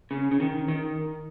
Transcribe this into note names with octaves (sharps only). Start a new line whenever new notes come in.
C#3
C#3
D#3
D#3